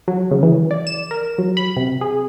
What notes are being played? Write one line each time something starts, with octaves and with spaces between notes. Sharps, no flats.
F#3
C#3
E3
D5
E7
A#4
F#3
B5
C3
G#4